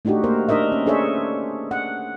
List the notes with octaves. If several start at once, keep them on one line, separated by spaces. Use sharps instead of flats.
A3 D4 D#4 F#4 G4
A#3 A#4 C5
D4 D#4 A#4 D#5 E5
C#4
D4 G#4 A4 C5 C#5 E5
F#5